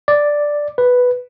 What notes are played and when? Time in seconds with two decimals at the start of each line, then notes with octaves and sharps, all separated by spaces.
0.08 D5
0.78 B4